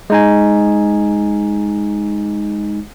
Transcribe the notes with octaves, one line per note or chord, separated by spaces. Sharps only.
G#3 D#4 G#5